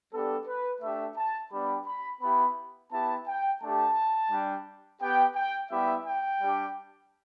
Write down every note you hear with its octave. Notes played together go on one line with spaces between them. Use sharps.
G3 B3 D4 G4 A4
B4
A3 D4 G4 E5
A5
G3 B3 D4 G4 B5
B5
B3 E4 G4 B5
B3 E4 G4 A5
G5
A3 D4 G4 A5
G3 D4 G4
B3 G4 G5
G5
G3 B3 E4 G4 E5
G5
G3 D4 G4